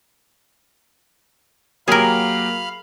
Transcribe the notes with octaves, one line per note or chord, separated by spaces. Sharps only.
F#3 A#3 G4 G#4 A#4 F5 B5 F6